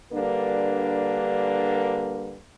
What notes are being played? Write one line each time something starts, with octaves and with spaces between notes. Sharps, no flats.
D3 G3 A#3 D4 A#4 B4